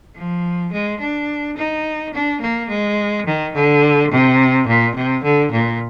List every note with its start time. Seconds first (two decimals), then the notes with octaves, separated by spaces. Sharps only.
0.15 F3
0.72 G#3
1.00 D4
1.57 D#4
2.13 D4
2.41 A#3
2.69 G#3
3.26 D#3
3.54 D3
4.11 C3
4.68 A#2
4.95 C3
5.23 D3
5.51 A#2